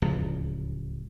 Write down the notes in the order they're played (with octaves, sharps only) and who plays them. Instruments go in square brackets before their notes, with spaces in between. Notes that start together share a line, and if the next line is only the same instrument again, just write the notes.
[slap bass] D1 C#2 F3